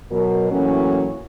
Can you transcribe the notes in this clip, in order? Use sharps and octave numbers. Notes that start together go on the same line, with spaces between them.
B2 F#3 A#4
A2 E3 F#3 A#3 C#4